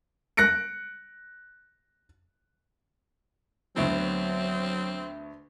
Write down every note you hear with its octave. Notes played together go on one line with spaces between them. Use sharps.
F#6 A#6 C#7 D7
D2 B2 F#3 C4